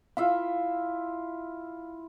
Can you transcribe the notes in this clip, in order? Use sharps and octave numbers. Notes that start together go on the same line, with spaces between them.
E4 F4 E5 F5